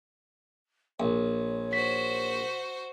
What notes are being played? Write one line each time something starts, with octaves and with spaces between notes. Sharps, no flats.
A#1 C#5
F#4 C5 B6